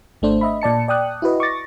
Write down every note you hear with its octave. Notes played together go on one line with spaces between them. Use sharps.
G#1 A3 D4 C5
D#5 E5 B5
A#2 D5 A5 C#7
D5 G5 D#6 F#6
E4 F#4 B4 D#5
C#6 D6 A6 A#6